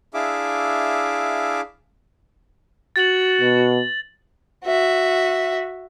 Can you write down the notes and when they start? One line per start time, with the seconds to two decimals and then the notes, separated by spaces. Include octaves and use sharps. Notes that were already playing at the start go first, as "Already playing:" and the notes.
0.14 D4 E4 G#4 E5 F5 D6
2.96 F#4 A6 F#7
3.41 B2
4.65 F#4 E5